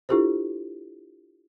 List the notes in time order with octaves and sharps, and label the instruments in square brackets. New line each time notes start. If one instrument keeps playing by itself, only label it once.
[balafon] D4 E4 F4 G4 A4 C5